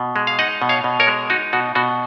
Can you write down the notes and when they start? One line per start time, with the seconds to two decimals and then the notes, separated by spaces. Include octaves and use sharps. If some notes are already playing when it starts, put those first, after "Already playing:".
Already playing: B2
0.16 G#3
0.27 F5
0.39 D#4 D#5 F#5
0.62 B2
0.69 C#5 F5
0.84 B2
1.00 A#4 C#5
1.07 G#3
1.30 D#4 F#4
1.53 B2 F#4
1.75 B2 F#4